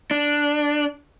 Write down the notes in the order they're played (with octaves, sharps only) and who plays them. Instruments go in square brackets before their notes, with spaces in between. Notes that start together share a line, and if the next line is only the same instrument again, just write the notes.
[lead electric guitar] D4